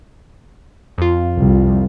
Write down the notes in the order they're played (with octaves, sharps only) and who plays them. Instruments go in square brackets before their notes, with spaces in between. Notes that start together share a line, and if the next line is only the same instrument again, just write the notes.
[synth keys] F2 F4
[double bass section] C2